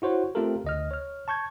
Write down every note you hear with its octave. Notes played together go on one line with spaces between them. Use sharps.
E4 F#4 C5 C#5
A3 C4 F4 G4 A4 A#4
D2 D#5 F6
C#5 F6
A5 C#6 G6 G#6